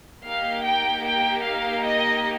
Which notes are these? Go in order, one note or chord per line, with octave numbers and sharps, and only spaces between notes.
A#3 D#4 G4 F5
G5
G5
F5
D#5